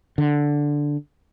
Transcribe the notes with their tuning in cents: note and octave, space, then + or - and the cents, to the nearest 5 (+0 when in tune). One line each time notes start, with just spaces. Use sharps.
D3 -5